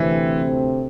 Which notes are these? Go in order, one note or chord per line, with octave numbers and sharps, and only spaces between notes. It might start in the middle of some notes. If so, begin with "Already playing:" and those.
Already playing: D2 C3 E3 A3 C4